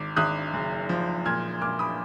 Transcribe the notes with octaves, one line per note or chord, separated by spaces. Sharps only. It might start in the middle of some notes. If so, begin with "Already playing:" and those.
Already playing: G#1 D6
G#1 D#6 F#6
F#1
F3
A#2 F6 G#6
A#2 D6 F6
B5 D#6